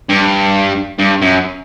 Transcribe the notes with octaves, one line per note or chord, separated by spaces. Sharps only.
G2
G2
F#2